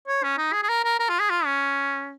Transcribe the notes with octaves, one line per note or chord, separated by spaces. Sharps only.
C#5
C#4
D#4
G#4
G#4
A#4
A#4
A#4
F4
G#4
F4
C#4